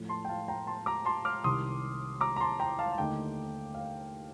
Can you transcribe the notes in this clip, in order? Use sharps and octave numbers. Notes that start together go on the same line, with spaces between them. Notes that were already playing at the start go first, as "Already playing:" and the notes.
Already playing: A2 F3 A3
A5 C6
G5
F5 A5
G5 A#5
A5 C6
A#5 D6
A5 C6
D6 F6
C2 C3 D#3 C6 D#6
A#5 D6
A#5
A5 C6
G5 A#5
F5 A5
A5
D#2 D3 A3 D#4 G5
F5